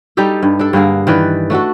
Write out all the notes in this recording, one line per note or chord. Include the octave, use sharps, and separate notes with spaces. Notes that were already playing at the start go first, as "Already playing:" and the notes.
G3 D#4 G4 A4
G2
D4 A4
G2 D3 A#3 G#4
D#3 E3 B4 D5
A3 D4 F#4 A4